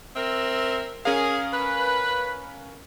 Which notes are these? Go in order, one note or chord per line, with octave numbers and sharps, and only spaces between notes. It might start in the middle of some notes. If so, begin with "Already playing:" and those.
C4 A#4 E5
C#4 G#4 A#4 F5
B4